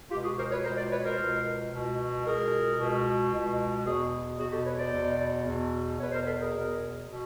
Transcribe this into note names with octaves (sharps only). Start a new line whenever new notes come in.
C#2 B2 F4 G4
F#4 G#4
A#4 C5
B4 C#5
C#2 B2 A#4 C5
C5 D5
B4 C#5
A#4 C5
C#2 B2
C#2 B2
C#2 B2 G#4 A#4
C#2 B2
C#2 B2
E2 B2 F#4 G#4
E2 B2 F#4 G#4
G4 A4
B4 C#5
C5 D5
E2 B2
E2 B2
E2 B2 B4 C#5
A#4 C5
A4 B4
G#4 A#4
E2 B2
B2